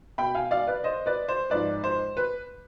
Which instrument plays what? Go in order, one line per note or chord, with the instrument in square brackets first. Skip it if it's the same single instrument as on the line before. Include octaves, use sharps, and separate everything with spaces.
[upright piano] B2 G5 B5
F5 G#5
D5 F5
B4 D5
C5 D#5
B4 D5
C5
G#2 F3 B4 D5
C5
B4